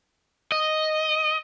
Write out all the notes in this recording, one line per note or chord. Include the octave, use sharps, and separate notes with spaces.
D#5